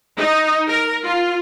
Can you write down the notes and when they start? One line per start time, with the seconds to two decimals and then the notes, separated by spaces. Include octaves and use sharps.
0.17 D#4
0.67 A#4
1.05 F4